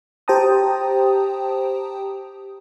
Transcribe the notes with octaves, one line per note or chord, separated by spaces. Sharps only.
G4 C5 G5 A5 A#5 D#6